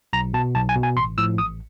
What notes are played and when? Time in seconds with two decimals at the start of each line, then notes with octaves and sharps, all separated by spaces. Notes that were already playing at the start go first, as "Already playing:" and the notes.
0.13 B1 A#5
0.34 B2 A5
0.55 B1 A5
0.69 G#5
0.76 B2
0.83 G#5
0.96 A1 C6
1.18 A2 F3 E6
1.38 A1 D#6